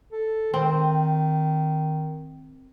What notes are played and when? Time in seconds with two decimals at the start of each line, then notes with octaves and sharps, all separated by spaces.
0.12 A4
0.54 D#3 C4